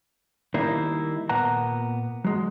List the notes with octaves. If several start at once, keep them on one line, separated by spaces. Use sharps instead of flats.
D#3 G3 A#3 D#4 E4
A#2 A#3 B3 F#5 A#5
F#3 G#3